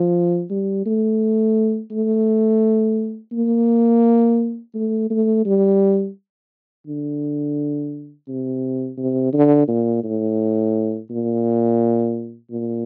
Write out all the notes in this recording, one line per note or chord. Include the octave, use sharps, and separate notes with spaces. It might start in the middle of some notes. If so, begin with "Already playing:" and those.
Already playing: F3
G3
A3
A3
A#3
A3
A3
G3
D3
C3
C3
D3
A#2
A2
A#2
A#2